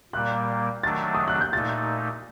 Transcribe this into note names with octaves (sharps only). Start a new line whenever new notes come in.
A#2 G3 A#3 F#6
D#3 F#3 A3 D4 A6
D#6
F#6
G6
A#2 A3 D#4 A6